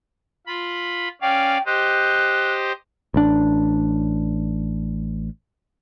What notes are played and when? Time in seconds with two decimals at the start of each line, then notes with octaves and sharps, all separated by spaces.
0.47 F4 B5
1.21 C#4 D5 F5 G5
1.66 G4 C5 D#5 F#6
3.14 A1 D4